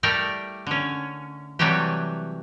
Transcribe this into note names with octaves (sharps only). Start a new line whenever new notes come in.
G3 A3 E4 A#4 D5 G5
D3 C#4
C3 E3 F#3 G3 A3 G4